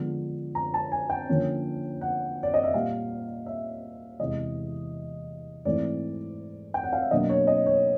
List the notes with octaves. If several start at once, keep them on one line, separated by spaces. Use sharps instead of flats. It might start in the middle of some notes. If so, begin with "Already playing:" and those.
Already playing: D3 F3 G#3 B3 D4
A#5
A5
G#5
G5
D3 F3 A#3 C#4
F#5
D5
D#5
E5
A#2 G3 A#3 F5
E5
E2 C3 E3 G#3 D#5
G#2 E3 A3 C4 D5
G5
F#5
F5
E5
B2 F#3 A#3 D4 D#5
C#5
D#5
C#5